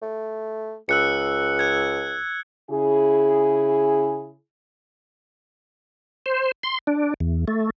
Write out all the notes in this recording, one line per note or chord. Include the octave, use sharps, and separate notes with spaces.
A3
C#2 E6 F#6 C#7
F#6 G#6
C#3 E4 G#4
C5
C6
D4
E2
A3